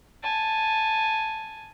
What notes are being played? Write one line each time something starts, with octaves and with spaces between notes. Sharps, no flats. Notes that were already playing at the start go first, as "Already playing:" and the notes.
G#5 A5